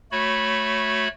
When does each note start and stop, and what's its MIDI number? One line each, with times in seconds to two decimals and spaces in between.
0.12 1.08 57
0.12 1.08 66
0.12 1.08 73
0.12 1.08 83